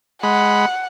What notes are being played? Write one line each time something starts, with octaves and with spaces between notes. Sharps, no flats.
G#3 F#5 B5